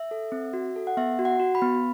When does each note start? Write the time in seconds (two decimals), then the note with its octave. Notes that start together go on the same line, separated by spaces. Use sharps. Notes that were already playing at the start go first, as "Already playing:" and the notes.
Already playing: E5
0.11 A4
0.32 C4
0.53 F#4
0.76 A4
0.87 F#5
0.97 B3 E5
1.19 F#4
1.25 F#5
1.40 F#4
1.55 B5
1.62 B3